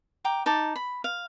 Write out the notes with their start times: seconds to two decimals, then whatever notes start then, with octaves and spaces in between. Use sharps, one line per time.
0.25 G5 A#5 D6
0.46 D#4 A5 D6
0.76 B5
1.04 F5